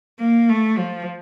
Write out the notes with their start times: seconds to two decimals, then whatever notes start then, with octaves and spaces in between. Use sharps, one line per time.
0.20 A#3
0.49 A3
0.78 F3